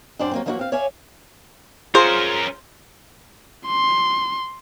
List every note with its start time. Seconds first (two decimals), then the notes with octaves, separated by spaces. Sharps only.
0.19 F#2 C4 D4 C5 D5 G5
0.31 F#3 A#3 C4
0.46 F3 F#3 A#3 D#4 E4 F#4
0.59 C4 F5
0.72 C#5 D5 E5 F5 G#5
1.95 C#4 F4 G#4 A#4 C5 C6
3.67 C6